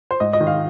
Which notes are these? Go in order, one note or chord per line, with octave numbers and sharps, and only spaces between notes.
C5
G#2 D#5
D#5
D#3
F5